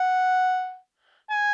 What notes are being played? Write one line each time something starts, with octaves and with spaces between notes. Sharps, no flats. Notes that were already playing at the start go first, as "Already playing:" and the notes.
Already playing: F#5
G#5